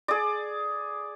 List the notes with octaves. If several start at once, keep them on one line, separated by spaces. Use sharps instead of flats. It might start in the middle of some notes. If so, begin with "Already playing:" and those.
G#4 D5